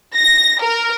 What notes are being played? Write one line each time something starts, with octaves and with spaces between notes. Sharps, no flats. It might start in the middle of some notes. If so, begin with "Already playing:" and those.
A#6
A#4